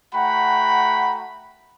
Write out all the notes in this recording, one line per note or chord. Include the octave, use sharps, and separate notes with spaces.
A3 F#4 F#5 G5 A#5 B5